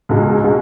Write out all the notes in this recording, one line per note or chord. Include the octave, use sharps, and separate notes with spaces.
C#2 B2 G#3
B2 G#3